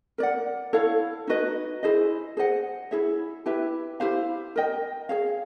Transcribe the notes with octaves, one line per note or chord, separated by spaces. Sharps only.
A#4 D5 F#5
E4 A4 C#5 F5
D#4 F#4 B4 D#5
E4 G#4 C5 D#5
G#4 C5 D#5 F#5
E4 G#4 C#5 E5
E4 G4 B4 E5
E4 G4 C5 F5
A#4 D#5 G5
G#4 C#5 F5